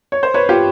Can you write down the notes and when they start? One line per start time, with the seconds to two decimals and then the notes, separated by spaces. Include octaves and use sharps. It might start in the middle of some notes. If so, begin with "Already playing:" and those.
0.12 C#5
0.23 C5
0.34 B4 C#5
0.49 F4 G4